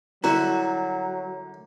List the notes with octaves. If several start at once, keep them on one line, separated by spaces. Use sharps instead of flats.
F#2 D3 F#3 G3 E4 F#4 E5 A#5